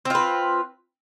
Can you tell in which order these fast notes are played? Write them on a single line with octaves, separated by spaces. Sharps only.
C4 F4 B4